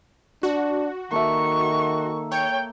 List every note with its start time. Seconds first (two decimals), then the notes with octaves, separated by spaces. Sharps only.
0.43 D4 F#4
1.11 D#3 A#3 A4 E5 C#6
2.32 C#5 G5